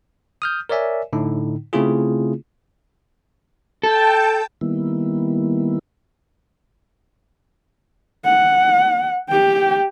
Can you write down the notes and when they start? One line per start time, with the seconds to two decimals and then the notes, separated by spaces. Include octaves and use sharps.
0.42 D#6 F6 G6
0.69 A#4 C#5 D5 E5 G#5
1.13 A2 D3 D#4
1.73 C#3 A3 C4 E4 F4 G#4
3.83 A4 G5 A5 G6
4.61 D#3 G3 A#3 B3 E4
8.25 F#5
9.29 G4 G5